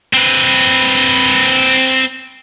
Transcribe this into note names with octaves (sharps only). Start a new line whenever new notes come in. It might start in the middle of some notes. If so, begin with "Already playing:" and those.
C4 B4